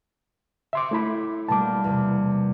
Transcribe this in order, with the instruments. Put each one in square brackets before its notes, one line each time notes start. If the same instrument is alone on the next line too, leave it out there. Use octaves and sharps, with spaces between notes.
[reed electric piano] E5 C6 D6 [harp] C7
[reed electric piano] A3 E4 B5
[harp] B2 G3 A#3 [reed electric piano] A5 D6
[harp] E2 C3